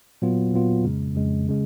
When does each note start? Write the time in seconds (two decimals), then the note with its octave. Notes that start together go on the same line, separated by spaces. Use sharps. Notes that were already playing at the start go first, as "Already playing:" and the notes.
0.22 A#2 F#3 B3 F4
0.54 A#2 F#3 B3 F4
0.84 F2 C#3 G#3
1.15 F2 C#3 G#3
1.48 C#3 G#3